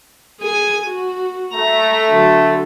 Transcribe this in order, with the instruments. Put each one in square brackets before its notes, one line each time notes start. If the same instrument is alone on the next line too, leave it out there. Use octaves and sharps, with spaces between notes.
[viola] G#4 G#5
F#4
[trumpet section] A3 [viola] A#5
[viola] D3 F#3